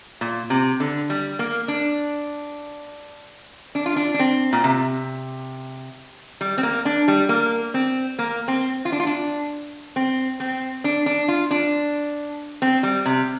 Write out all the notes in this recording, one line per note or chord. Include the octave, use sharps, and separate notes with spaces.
A#2
C3
D3
G3
A#3
D4
D4
F4
D4
D4
C4
A#2
C3
G3
C4
A#3
D4
G3
A#3
C4
A#3
C4
F4
D4
F4
D4
C4
C4
D4
D4
F4
D4
C4
G3
C3